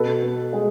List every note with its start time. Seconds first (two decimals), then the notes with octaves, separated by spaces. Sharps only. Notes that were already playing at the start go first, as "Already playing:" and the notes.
Already playing: B2 A4 B4
0.22 B3
0.53 G#3